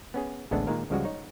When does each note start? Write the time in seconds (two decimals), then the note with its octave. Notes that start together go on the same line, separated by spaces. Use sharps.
0.14 B3 C#4 G#4
0.51 A1 D2 G#3 B3 D4 A4
0.67 A#2 D#3 G#3 A#3 A#4
0.90 C#2 C#3 F3 G3 G#3 F#4
1.05 D#4 C#5